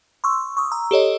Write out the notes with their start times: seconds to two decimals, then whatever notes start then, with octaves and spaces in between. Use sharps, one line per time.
0.24 C6 C#6 E6
0.57 C#6 D#6
0.72 A#5 E6
0.91 G4 A4 C#5 D#5